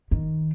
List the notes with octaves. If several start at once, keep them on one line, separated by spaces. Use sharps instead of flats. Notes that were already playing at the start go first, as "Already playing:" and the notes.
D#3